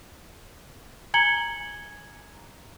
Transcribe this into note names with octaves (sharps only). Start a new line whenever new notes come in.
G#5 A#5 G#6 C#7 F#7 G7